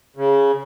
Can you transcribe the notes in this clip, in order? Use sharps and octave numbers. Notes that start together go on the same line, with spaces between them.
C#3